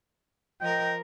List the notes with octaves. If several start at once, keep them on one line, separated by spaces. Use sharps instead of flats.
F3 A#4 D#5 G5